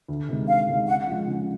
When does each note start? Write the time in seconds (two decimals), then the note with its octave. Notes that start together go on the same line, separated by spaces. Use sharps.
0.08 D2
0.29 C3 D#3 G#3
0.48 D2 F5
0.68 C3 D#3 G#3
0.88 C#3 F#5
1.07 F3 G#3
1.28 C#3